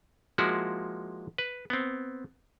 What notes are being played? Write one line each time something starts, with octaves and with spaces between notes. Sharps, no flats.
F3 G#3 A#3 E4 F#4
B4
B3 C4